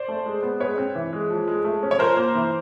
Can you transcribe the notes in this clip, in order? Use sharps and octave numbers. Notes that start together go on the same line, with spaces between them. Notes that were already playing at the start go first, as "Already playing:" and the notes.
Already playing: C5 D5
A3
G#3
B3
G#3 B4 C#5
C4
E3
G#3
F3
G#3
A3
C#4
C#5
F3 A#4 C5
A#3
E3